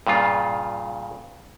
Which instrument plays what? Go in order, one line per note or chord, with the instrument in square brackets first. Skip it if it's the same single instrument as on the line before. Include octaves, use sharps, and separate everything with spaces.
[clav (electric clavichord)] G2 A#2 C#3 F4